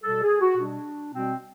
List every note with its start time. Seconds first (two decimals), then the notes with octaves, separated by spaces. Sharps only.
0.03 B2 G3 A4
0.22 G#4
0.39 F#4
0.57 B2 G3 D4
1.12 B2 G3 C4